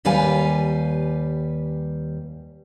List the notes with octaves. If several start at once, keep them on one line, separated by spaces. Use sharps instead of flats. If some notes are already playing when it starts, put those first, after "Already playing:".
D#2 G3 B4 F5 G#5